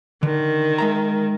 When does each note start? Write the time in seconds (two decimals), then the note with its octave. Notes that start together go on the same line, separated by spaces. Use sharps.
0.23 D3 D#3
0.78 G#3 E5 A#5